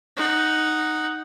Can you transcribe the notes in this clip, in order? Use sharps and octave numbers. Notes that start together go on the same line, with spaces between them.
D#4 F#5